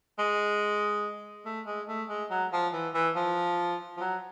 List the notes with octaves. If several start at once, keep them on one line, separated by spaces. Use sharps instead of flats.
G#3
A3
G#3
A3
G#3
F#3
F3
E3
E3
F3
F3
F#3